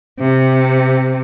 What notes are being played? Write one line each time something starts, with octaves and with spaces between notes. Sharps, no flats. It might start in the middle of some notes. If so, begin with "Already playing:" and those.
C3